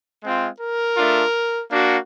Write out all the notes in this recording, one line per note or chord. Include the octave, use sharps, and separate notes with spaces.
G#3 C4 F4
A#4
A3 D4 F4
A#3 D4 F#4